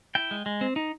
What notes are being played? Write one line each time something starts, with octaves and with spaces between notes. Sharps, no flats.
E4 G5
G#3
G#3
C4
D#4